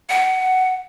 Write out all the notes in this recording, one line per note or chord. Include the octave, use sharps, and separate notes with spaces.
F#5